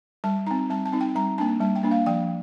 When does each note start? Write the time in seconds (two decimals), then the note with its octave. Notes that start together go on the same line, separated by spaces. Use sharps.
0.24 G3 A5
0.46 C4 D#4 A#5
0.70 G3 A5
0.86 A5
0.93 C4 D#4
1.01 G5
1.15 G3 A#5
1.38 A#3 D4 A5
1.61 G3 A5
1.76 G5
1.83 A#3 D4
1.91 F5
2.06 F3 G5